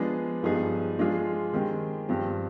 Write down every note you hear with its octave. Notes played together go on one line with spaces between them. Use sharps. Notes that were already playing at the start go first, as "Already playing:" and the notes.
Already playing: F3 G#3 B3 D4 G#4
G2 F3 B3 D#4 G#4
F3 G#3 D4 F4 G#4
D#3 G#3 C4 G4
G2 F3 C4